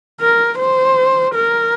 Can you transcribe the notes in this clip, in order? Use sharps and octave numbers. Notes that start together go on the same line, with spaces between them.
A#4
C5
A#4